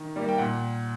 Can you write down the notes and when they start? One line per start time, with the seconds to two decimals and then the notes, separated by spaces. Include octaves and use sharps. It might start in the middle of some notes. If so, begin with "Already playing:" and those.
Already playing: D#3
0.16 G3 A#3
0.29 G5
0.38 A#2 F#5